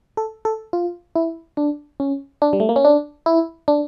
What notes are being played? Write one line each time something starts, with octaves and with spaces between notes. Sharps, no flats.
A4
A4
F4
E4
D4
C#4
D4
G3
A3
A#3
C#4
D4
E4
D4